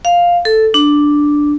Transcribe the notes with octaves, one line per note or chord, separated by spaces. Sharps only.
F5
A4
D4